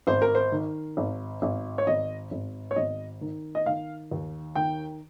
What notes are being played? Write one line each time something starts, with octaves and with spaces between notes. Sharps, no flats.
G#1 C5
A#4
C5
D#3
G#1
G#1
C#5
G#1 D#5
G#1
C#5
G#1 D#5
D#3
D#5
D#3 F5
D#2
D#3 G5